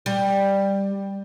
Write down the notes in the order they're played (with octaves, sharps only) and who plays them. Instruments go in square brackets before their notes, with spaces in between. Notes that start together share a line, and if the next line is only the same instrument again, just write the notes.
[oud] G3